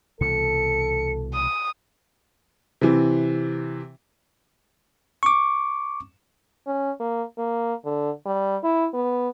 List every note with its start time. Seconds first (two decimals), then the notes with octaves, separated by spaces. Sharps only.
0.21 C2 B2 E3 A4 C#7
1.34 D#6
2.81 C3 E3
5.23 C#6 D6
6.67 C#4
7.00 A#3
7.38 A#3
7.85 D3
8.26 G3
8.64 E4
8.94 B3